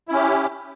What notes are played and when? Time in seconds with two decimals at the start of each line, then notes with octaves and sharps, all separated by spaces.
0.08 E4
0.12 C#4
0.15 G4